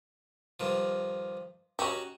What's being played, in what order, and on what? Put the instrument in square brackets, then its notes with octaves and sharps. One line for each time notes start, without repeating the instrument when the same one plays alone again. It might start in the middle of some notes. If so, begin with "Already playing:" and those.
[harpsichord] G2 D#3 F3
[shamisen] C#4 G4 [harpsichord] D#4 F#4 C#6